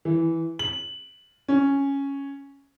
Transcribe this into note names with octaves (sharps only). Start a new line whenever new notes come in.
E3
F#7
C#4